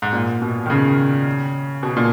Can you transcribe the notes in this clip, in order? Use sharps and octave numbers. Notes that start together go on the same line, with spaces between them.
G#2
A#2
B2
D#3
C#3
B2
A#2